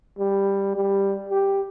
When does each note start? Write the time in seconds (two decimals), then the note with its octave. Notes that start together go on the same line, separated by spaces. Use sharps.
0.19 G3
0.76 G3
1.29 G4